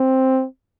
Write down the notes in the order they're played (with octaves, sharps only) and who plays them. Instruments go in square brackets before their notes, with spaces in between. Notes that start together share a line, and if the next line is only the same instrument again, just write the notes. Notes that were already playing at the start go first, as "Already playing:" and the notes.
Already playing: [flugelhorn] C4